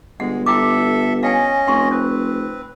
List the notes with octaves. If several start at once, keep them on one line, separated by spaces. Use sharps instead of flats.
G1 G#3 F#5
E4 A4 E5 G5 D6
C#4 D#5 F5 G5 G#5
F1 F#5 C6 C#6
C4 B4 C#5